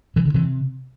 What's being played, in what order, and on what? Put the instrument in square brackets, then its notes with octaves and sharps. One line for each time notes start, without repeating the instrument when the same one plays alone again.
[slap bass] C3 E3
D3
C3 E3